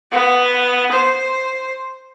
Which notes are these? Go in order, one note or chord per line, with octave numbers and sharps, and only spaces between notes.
B3
C5